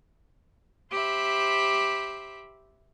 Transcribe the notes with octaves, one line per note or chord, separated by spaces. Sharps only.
G4 C5 E5 B5